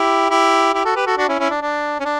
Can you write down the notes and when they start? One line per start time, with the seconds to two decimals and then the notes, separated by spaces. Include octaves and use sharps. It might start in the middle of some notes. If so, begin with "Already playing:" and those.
Already playing: E4 G4
0.30 E4 G4
0.73 E4 G4
0.85 F#4 A4
0.96 G4 B4
1.06 F#4 A4
1.17 D4 F#4
1.28 C#4 E4
1.39 C#4 E4
1.50 D4
1.62 D4
2.00 C#4
2.05 D4